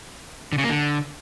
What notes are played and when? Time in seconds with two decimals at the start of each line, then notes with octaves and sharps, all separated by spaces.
0.52 D3
0.58 C#3
0.64 A#3
0.69 D3